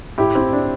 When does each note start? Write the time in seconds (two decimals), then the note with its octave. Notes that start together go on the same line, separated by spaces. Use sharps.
0.18 A2 E4 G4
0.35 C4 E4
0.53 D4